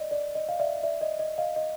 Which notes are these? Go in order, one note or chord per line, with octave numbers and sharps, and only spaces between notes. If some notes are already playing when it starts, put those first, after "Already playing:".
Already playing: D5 D#5
D5
D#5
F5
D5 E5
D5 E5
D#5
D#5
D#5 F5
D#5